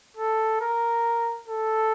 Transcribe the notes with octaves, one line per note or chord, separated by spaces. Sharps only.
A4
A#4
A4